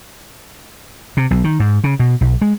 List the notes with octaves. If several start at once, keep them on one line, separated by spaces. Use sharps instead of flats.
C3
B1
D#3
G#2
C#3
B2
B1
G#3